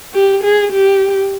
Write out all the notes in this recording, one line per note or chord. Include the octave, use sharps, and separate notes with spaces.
G4
G#4
G4